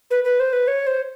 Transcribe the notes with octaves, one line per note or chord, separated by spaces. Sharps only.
B4
B4
C5
B4
C#5
C5